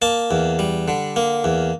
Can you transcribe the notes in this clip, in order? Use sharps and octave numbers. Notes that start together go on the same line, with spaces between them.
A#3 A5
E2
G3
D3
A#3
E2